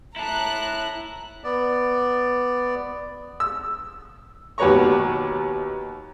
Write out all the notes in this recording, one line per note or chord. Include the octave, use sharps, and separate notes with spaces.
E4 A5 A#5 F#6
B3 D5
E6
D#2 B2 B4 C#5 A#5 C#6